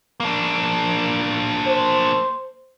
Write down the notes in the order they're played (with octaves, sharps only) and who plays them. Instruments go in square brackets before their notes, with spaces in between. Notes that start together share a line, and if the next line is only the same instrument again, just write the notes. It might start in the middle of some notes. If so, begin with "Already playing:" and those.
[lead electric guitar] A#3 D4
[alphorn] C5